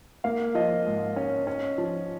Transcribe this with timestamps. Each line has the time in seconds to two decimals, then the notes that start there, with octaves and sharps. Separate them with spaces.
0.24 A#3 F5
0.55 F3 D#5
0.86 G#2
1.16 C#4
1.47 C#4
1.78 F3